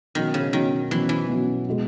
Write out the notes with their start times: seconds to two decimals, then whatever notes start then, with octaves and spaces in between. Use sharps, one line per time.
0.15 B2 D#3 F#3 C#4
0.34 C#3
0.53 B2 D#3 F#3 C#4
0.91 B2 E3 F#3 C#4
1.09 E3
1.29 B2 F#3 C#4
1.69 B2 G#3